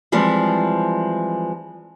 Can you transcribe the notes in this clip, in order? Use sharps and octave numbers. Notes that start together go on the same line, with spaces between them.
E3 F3 G3 G#3 C4